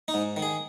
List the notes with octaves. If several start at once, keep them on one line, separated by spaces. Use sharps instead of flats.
D#4
G#2
D#3
G#4